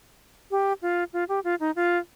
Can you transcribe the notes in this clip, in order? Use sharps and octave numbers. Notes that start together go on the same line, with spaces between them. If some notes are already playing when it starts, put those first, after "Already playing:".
G4
F4
F4
G4
F4
D#4
F4